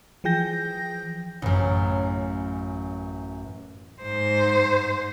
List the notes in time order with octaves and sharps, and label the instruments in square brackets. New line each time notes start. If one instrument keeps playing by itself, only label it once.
[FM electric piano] E3 F3 G#4 G5 G6 A#6
[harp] A1 F#2
[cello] G#2 C5